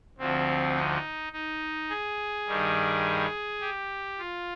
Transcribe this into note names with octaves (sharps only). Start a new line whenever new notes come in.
D2 D3 F3 C4
D#4
D#4
G#4
G2 D#3 G3
G4
F4